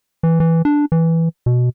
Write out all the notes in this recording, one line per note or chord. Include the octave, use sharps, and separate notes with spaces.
E3
E3
D4
E3
B2